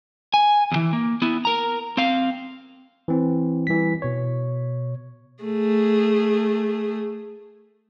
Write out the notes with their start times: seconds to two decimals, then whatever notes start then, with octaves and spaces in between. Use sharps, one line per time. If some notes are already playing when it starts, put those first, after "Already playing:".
0.34 G#5
0.72 E2 E3
0.93 A#3
1.22 B3 E4
1.45 A#4 A#5
1.97 C4 F5
3.08 E3 C4
3.67 E3 G3 B6
4.02 B2 C#5
5.44 A3 G#4